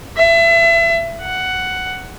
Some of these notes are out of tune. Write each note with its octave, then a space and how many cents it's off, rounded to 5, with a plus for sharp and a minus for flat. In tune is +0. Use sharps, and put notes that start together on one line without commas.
E5 +30
F#5 +10